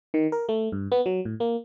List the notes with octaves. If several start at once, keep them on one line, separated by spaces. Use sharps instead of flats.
D#3
A#4
A3
G2
B3
F#3
A2
A#3